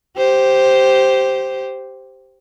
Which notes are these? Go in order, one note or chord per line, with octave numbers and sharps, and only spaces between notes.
G4 C5